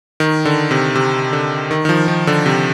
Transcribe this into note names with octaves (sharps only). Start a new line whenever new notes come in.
D#3
D3
C3
C3
D3
D#3
D#3
F3
D#3
D3
C3